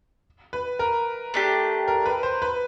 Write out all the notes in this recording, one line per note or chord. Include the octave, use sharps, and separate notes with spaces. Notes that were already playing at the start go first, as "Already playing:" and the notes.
B4
A#4
A3 D4 G4
A#4
B4
C5
B4